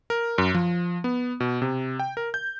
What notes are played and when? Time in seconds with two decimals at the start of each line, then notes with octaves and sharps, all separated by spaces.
0.10 A#4
0.38 F#2
0.54 F3
1.04 B3
1.40 B2
1.62 C3
1.99 G5
2.17 A#4
2.34 G6